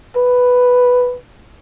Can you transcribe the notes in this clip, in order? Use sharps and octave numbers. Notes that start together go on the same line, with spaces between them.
B4